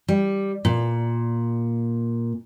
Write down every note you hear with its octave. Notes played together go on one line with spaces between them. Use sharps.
G3
A#2